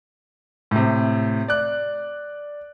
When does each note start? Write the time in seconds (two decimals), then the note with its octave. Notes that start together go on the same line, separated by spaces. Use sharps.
0.71 A2 C3
1.48 D5 F#6